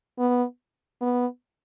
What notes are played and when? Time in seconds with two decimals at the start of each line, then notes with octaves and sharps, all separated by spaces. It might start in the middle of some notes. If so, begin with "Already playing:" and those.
0.19 B3
1.01 B3